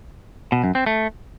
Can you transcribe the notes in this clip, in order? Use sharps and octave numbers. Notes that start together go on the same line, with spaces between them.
B2
F#2
C4
A3